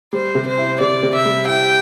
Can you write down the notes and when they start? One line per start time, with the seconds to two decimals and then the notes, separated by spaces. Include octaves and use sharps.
0.13 G3 C5
0.35 C3
0.47 C5
0.58 E4
0.80 C3 D5
1.03 C3
1.14 E5
1.25 G3
1.47 E4 G5